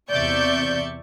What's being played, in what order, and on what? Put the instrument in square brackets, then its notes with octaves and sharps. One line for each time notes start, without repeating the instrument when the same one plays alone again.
[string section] E2 C3 D5 E5 C#6 G6